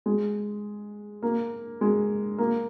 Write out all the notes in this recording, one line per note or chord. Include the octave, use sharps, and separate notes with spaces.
G#3
A#3
G#3
A#3